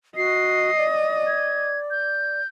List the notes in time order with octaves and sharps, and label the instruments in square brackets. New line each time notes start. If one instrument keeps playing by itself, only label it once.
[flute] F#4 [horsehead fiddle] D#5 [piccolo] C7
[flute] D5
[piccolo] G#6
G6